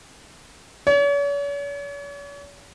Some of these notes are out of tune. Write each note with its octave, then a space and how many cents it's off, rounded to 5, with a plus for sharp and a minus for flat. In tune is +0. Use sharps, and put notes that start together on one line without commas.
C#5 +45